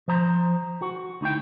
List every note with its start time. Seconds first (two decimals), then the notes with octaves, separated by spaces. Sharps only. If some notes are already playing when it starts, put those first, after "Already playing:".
0.08 F3 C5 A#5
0.82 F#4
1.21 D2 D#4 E4 G5